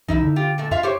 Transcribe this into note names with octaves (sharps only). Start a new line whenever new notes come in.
B1 F#2 E3 D#4 E4 E5
D3
F4 G4
A#2 A3
F#2 F4 E5 F5
G4 C5 C#5